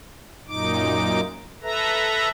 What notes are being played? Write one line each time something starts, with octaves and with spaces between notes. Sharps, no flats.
F#2 A#2 D#4 D6
A4 B4 E5 A#5